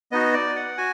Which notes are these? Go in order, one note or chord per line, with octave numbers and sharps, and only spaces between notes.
B3 D#4 F#4 D#5
D5
F#5
F#4 G#5